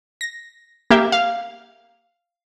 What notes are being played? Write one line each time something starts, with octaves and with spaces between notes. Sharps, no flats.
A#6
A#3 G4 E5
F5